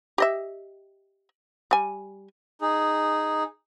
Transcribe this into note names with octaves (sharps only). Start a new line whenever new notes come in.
G4 D#5 E5
G3 G#5
D#4 G#4